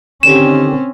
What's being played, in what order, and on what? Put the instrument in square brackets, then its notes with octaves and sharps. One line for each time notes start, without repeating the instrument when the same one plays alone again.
[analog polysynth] D3 D#3 G4 [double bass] C4 C#4 [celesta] E7